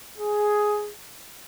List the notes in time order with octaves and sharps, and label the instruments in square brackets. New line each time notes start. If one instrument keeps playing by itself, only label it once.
[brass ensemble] G#4